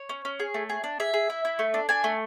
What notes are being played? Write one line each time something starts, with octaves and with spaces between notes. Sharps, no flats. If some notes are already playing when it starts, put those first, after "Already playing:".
Already playing: C#5
C#4
C#4
G#4
A3
G#4
D4
G#4 E5
G#4
E4
E4
A3
D4
D4 G#5
A3